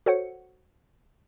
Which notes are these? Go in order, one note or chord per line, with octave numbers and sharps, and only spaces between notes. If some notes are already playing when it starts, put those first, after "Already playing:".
F#4 A4 C5 C#5 F#5 C#7